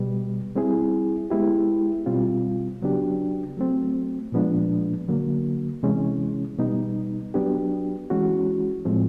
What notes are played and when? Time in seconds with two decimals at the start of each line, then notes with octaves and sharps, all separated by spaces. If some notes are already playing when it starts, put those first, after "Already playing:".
Already playing: B2 G3 B3
0.56 G3 C4 E4 G#4
1.30 G#3 B3 E4 G4
2.06 B2 G3 C4 F4
2.82 C#3 F#3 B3 D4 G4
3.57 F#3 A3 C4
4.32 A#2 F3 G#3 B3 D4
5.08 D3 F#3 A#3
5.83 C3 E3 G#3 C#4
6.59 B2 G3 B3 D#4
7.34 F#3 B3 D4 G4
8.10 E3 G#3 C#4 F#4
8.85 A2 F3 G#3 C4